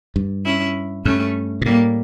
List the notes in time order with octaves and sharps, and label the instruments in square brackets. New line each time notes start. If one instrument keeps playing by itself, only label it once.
[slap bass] G2
[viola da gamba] C#4 E4
[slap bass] G2 [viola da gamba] A3 C#4
[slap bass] A#2
[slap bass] A2 [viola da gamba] G3 A#3